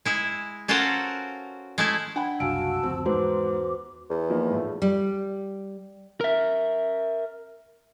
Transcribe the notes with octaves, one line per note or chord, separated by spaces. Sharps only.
G#3 E4
C#4 F4 F#4 A4 A#4 C5
G#3 A3 E4
D4 F#5 G5 B5
F#1 C2 F#4 F5 G#5 A5 E6 D7
F#1 D2 F3 C4
E2 G#2 F#4 B4 C5 D6
E2
F3 A#3 D#4
A2 A3
G3
A#4 E5